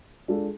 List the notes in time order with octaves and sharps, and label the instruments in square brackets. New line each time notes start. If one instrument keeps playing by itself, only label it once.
[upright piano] G#3 D4 F4 A4